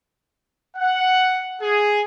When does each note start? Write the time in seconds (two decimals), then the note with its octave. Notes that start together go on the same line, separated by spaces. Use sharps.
0.77 F#5
1.62 G#4